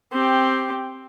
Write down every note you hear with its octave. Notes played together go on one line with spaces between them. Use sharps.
C4 G4